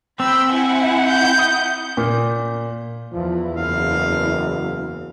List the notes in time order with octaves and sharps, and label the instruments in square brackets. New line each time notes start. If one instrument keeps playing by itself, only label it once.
[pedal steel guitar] C4 [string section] G5 B5 [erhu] E6
[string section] E4 F#5 [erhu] G#5
[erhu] G6
[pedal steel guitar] D#6
[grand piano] A#2
[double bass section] E2 E3 [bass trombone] F3
[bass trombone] F#1 [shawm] F5